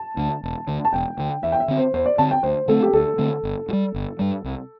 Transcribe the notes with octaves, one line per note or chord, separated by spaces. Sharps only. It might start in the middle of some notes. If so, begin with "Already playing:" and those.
Already playing: A5
D2 D3
E1
D2 D3
A5
E1 G5
D2 D3
E2 E5
G5
E5
D3 C4
C5
E2 C5
D5
D3 C4 A5
G5
D2 C5
D3 A3 C4 A4
G4
D2 A4
D3 A3 C4
G1
G2
G3
G1
G2 G3
C2